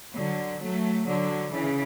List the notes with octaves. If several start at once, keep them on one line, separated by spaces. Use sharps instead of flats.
D3 F#3
F#3 A3
D3 F#3
C#3 E3